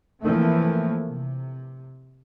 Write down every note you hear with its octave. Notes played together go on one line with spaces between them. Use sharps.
E3 F3 A3 A#3 C4
C3